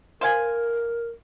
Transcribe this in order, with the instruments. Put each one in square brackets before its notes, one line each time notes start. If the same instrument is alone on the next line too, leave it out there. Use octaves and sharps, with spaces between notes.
[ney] A#4 [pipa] C5 F5 G#5